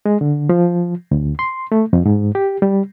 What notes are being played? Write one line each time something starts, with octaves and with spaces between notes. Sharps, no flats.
G#3
D3
F3
D2
C6
A3
F2
G#2
G4
G3